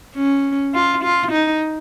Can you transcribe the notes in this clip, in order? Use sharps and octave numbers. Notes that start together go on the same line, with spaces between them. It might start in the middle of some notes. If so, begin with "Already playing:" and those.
C#4
F4
F4
D#4